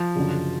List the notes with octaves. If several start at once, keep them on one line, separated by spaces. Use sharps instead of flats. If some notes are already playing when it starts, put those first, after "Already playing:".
Already playing: F3
F#1 F#2 D3